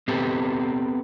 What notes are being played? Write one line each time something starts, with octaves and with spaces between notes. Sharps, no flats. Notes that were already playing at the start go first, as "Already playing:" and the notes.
B3 C4 G4 A4 B4